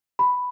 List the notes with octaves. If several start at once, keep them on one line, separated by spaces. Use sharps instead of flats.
B5